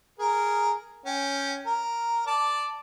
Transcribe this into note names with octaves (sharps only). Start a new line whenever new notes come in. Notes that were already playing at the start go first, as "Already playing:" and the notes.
G#4 A#4
C#4 G5
A#4
D5 A5